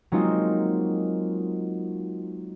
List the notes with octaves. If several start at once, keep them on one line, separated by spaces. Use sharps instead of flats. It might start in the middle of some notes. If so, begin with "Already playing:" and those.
F#3 G#3 A#3 C4 D#4 F4